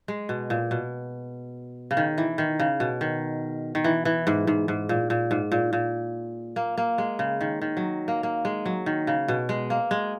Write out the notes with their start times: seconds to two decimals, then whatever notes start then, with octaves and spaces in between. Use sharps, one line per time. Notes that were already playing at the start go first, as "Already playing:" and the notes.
0.08 G#3
0.29 B2
0.50 A#2
0.71 B2
1.91 C#3
1.97 D#3
2.18 E3
2.38 D#3
2.59 C#3
2.80 B2
3.01 D#3
3.75 D#3
3.84 E3
4.05 E3
4.27 G#2
4.47 G#2
4.68 G#2
4.89 A#2
5.10 A#2
5.31 G#2
5.52 A#2
5.73 A#2
6.56 A#3
6.77 A#3
6.98 G#3
7.19 C#3
7.41 D#3
7.61 D#3
7.77 F#3
8.08 A#3
8.23 A#3
8.45 G#3
8.66 F#3
8.86 D#3
9.07 C#3
9.28 B2
9.49 G#3
9.70 A#3
9.91 G#3